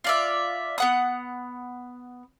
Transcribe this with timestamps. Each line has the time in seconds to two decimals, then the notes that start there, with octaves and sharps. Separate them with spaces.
0.04 F4 D5 E5
0.78 B3 F#5 D#6